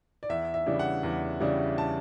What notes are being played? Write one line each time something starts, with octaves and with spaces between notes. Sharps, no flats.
D5
E2 E5
E5
C#3 E3 G3 D4
F#5
E2
C#3 E3 G3 D4
A5